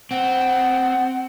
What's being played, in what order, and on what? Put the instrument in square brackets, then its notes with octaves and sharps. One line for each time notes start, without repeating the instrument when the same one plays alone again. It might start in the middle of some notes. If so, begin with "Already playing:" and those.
[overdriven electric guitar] C4 [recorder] F#5